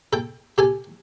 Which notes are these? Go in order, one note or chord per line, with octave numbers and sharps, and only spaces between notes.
A4 G5
G4 A4 G#5